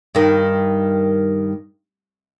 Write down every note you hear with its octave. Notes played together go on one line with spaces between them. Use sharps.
G2 D#3